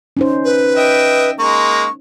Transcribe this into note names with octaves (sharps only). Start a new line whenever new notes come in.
C#4 D#4 C5
B4
D#5 E5 G5
G#3 A#3 C#6